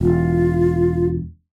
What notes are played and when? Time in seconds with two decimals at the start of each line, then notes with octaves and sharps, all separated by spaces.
0.01 E1 F4